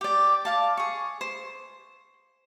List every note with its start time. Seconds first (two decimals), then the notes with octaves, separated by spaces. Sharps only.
0.01 G4 D5
0.45 D5 F5 A5
0.77 G#4 C#6
1.21 C5